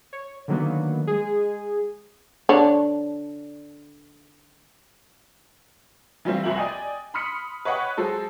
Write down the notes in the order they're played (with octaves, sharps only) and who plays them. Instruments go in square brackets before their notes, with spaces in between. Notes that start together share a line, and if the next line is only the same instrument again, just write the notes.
[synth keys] C#5
D3 D#3 F#3 A#3 B3
G#3 G#4
[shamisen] D3 D4 C#5
[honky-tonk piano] E3 F#3 G3 A3 C4 F4
F1 C2 F#4 A#4 E5 F#7
D5 D#5 G5 G#5
B5 C6 D#6 F6 B6 C#7
B4 C#5 D#5 F#5 G5 C#6
F#3 G#3 A4 C5